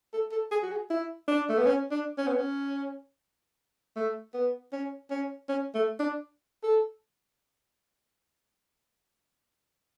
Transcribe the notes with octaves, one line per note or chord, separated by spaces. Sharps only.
A4
A4
G#4
F#4
G#4
E4
D4
A3
B3
C#4
D4
C#4
B3
C#4
A3
B3
C#4
C#4
C#4
A3
D4
A4